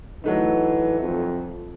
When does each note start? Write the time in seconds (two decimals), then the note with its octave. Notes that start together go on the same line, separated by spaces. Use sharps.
0.24 E3 F#3 A3 D#4
1.00 F2